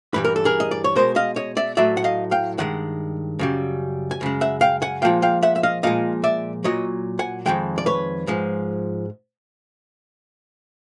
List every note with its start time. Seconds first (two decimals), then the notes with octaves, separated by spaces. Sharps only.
0.14 G2 E3 G3 B4
0.25 A#4
0.36 A4
0.45 G#4 A#4
0.60 D#5
0.71 D5
0.84 C#5
0.96 B2 G#3 A#4 C5
1.16 D#5 F5
1.36 C#5 D#5
1.57 D5 E5
1.77 A2 F#3 D5 E5
1.97 F#5
2.04 D#5 F5
2.31 F5 G5
2.58 G2 D#3 G#3 F#5
3.39 F#2 C#3 G3
4.11 G#5
4.21 F#2 C#3 G#3
4.41 E5 F#5
4.61 F5 G5
4.82 F#5 G#5
5.02 A#2 F3 G#3 F5 G5
5.22 F5 G5
5.43 E5 F#5
5.56 E5
5.63 D#5 F5
5.83 A#2 F3 G#3 D#5 F5
6.24 D5 E5
6.64 A#2 F#3 C#5 D#5
7.19 F#5 G#5
7.46 F2 C3 D#3 G#3 G5
7.78 D5
7.86 B4 C#5
8.27 G#2 F3 G#3